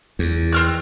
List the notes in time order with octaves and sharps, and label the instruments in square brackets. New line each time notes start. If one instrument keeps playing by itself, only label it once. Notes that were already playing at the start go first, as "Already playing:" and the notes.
[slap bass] E2
[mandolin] C4 F6 F#6